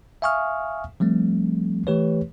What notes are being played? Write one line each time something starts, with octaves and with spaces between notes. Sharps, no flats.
E5 F5 G#5 C#6 D#6 F6
F3 G3 A3 C4
E3 A3 G4 B4 C#5